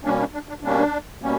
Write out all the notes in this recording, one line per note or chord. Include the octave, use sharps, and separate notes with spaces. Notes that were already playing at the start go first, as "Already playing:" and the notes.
B2 G3 A#3 C#4 D4
D4
D4
D4
B2 G3 A#3 C#4 D4
B2 G3 A#3 C#4